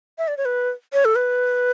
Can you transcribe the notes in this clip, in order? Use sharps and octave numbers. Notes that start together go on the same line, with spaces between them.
E5
D5
C#5
B4
C#5
A4
B4